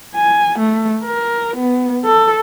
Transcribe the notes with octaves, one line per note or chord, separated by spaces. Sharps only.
G#5
A3
A#4
B3
A4